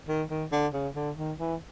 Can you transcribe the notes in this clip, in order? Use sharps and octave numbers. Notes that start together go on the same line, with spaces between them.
D#3
D#3
D3
C#3
D3
D#3
E3